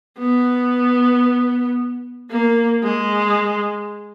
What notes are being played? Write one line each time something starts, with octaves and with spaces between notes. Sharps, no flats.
B3
A#3
G#3